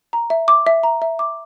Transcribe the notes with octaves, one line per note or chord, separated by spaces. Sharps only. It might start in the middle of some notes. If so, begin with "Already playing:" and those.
A#5
E5
D6
E5
A#5
E5
D6